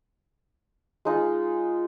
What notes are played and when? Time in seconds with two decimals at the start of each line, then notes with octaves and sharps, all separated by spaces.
1.05 G#3 D#4 F4